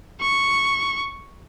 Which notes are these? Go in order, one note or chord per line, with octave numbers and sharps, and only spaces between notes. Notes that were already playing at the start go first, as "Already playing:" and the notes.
C#6